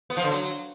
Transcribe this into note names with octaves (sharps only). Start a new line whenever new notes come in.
B3
F3
D3
F#3